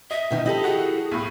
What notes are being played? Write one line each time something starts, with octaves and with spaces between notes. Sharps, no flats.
D#5 E5
B2 D#3 D#4
F3 E4 G4 A4 D#5
F#4 G#4
B1 A2